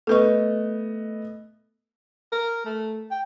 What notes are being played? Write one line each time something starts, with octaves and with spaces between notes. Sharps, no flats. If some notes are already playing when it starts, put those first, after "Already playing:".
A3 B3 A4 B4 D#5 C#6
A#4
A3
G5